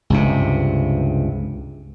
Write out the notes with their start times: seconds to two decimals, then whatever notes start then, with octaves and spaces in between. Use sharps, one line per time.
0.10 C#2 G2 C3